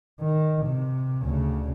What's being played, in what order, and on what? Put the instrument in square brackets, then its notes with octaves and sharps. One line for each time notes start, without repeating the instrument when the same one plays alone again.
[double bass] D#3
C3
D2 C#3